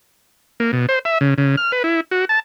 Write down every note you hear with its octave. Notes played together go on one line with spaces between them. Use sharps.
A#3
B2
C5
E5
C#3
C#3
F6
B4
E4
F#4
A5